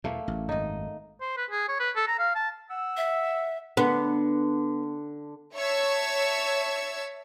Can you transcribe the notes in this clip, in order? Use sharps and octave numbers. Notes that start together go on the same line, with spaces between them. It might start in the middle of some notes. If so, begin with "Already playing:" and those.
E2 B2 A3 A#3
A1
G#1 F#2 D#4 D#5
C5
B4
G#4
C#5
B4
A4
A#5
F5
A5
F#5 E6
E5
D3 B3
C#5 E5 A5 C#6 E6 G#6